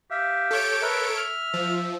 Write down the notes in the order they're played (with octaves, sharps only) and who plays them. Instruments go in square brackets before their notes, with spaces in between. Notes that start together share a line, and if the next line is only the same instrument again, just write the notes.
[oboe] G4 [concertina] E5 F5
[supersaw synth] A4 C#5 D7
[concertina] A#4 B4 [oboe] E5
[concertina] F6
[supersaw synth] F3